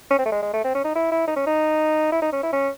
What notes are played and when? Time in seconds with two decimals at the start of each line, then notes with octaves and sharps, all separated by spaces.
0.11 C#4
0.19 C4
0.26 A3
0.32 G#3
0.43 G#3
0.53 A3
0.64 C4
0.75 C#4
0.85 D#4
0.95 E4
1.12 E4
1.27 D#4
1.36 C#4
1.47 D#4
2.12 E4
2.22 D#4
2.33 C#4
2.43 E4
2.53 C#4